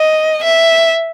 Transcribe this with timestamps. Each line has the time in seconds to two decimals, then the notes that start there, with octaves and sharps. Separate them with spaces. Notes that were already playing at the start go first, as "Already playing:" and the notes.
Already playing: D#5
0.44 E5